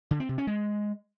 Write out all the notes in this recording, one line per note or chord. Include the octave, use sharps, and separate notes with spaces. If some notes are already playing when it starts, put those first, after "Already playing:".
D3
C4
C3
C#4
G#3